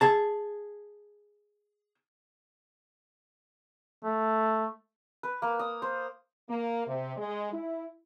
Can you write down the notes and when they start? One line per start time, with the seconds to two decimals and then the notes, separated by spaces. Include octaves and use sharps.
0.01 G#4 A5
4.04 A3
5.23 B4
5.42 A#3
5.59 D#6
5.82 C5
6.49 A#3
6.87 C3
7.17 G#3
7.53 E4